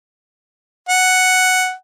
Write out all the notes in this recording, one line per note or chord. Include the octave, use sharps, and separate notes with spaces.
F#5